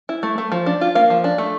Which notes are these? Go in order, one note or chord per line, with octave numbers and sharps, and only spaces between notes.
E4
A3
A3
F3
D4
F4
A#3 F5
F3
D4
A3